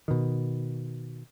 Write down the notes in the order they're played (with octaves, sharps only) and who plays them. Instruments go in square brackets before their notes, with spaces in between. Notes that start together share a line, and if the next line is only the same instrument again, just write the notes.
[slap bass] B2 D#3